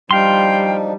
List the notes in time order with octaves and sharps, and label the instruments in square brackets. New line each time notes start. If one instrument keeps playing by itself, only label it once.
[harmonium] F3 D4 D#4 [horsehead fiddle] G3 [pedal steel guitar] F5 C6 [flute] G5